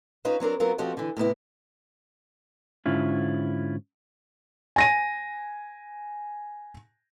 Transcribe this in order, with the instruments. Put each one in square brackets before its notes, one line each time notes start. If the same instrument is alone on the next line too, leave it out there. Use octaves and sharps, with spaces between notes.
[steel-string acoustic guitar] C#4 D#4 F4 B4 C5
F#3 C4 D4 A#4
F#3 B3 C4 F4 A#4
F3 C4 F#4 G4 A4 D#5
D3 E3
A2 C3 B3 E4
[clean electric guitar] G#2 D3 C#4 E4 F4
[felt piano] G#5 A#6 D#7